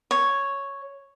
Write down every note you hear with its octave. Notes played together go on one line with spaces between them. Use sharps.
C#5